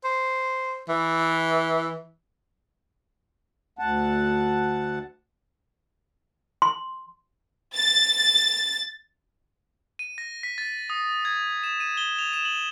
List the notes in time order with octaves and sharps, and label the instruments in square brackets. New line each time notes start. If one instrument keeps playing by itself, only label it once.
[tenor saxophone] C5
E3
[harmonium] D2 F#5 A5
[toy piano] C6
[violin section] A6
[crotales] D#7
A#6
B6
A6
D#6
G#6
E7
D#7
G7
F7
E7
F#7